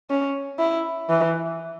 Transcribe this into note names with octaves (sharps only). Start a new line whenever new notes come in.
C#4
E4
E3